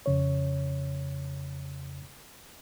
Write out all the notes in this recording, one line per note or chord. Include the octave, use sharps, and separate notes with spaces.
F2 C#3 C#5